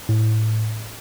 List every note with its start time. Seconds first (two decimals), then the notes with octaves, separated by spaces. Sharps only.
0.09 A2